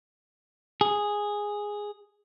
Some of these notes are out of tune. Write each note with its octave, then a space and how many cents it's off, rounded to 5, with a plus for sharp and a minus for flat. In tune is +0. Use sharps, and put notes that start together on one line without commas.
G#4 -5